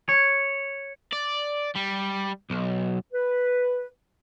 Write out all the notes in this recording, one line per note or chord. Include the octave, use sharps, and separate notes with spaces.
C#5
D5
G3
B1
B4